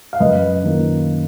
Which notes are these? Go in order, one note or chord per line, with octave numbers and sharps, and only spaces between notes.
F5
F#2 B4 D#5
D#3 A#3 D#4